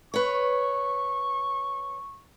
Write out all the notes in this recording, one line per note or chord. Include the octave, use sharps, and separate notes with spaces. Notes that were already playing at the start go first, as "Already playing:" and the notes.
B4 C#5 C#6